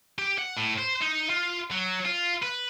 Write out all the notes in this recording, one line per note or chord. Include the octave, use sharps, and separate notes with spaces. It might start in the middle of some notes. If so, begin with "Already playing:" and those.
G4
F#5
A2
C5
D#4
F4
F#3
F4
B4